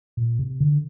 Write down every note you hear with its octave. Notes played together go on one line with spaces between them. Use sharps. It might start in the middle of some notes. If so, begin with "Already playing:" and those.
A#2
C3
D3